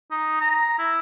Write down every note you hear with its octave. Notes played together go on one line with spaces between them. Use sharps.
D#4
A#5
E4